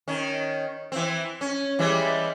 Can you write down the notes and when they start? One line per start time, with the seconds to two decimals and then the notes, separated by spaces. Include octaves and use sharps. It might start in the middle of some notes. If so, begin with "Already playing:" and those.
0.08 D#3 C#4
0.92 E3 C4
1.41 C#4
1.79 E3 G3 G#3